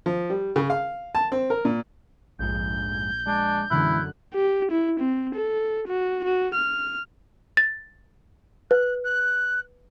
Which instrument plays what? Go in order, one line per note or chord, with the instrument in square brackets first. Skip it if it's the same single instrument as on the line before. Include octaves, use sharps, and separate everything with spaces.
[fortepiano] F3
G3
C#3
F5
A5
C4
A#4
A#2
[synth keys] A#1 [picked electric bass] F2 G#2 [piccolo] G6
[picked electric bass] G#3 [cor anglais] D4
[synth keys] F#2 D3 F#6 [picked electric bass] B2 E3 G#3 [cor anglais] E4
[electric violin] G4
E4
C4
A4
F#4
F#4
F6
[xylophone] A6
[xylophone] B4 [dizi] F#6
[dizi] F#6